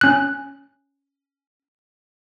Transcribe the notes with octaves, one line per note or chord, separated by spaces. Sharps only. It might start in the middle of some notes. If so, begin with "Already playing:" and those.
C#4 F#6